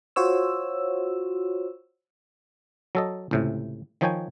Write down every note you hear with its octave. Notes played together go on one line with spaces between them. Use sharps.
F4 F#4 C5 C#5 E6
F#3 A4 D#5
C#2 A2 C3
D#3 F3 D#4 C#5 G5 G#5